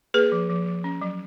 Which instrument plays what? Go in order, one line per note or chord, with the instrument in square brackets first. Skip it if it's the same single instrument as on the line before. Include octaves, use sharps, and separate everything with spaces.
[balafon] A#3 G#4 B4
F3
F3
F3
C#4
F#3